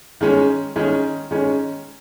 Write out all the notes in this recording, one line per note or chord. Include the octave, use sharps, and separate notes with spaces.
D#3 G#3 C#4
D#3 G#3 C#4
D#3 G#3 C#4